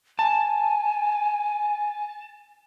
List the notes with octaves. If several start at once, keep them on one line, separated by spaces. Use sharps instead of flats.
G#5 A5